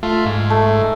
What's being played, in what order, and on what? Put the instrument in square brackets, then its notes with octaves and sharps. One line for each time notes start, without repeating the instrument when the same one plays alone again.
[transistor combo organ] A3 F4
G#2
[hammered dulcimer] A3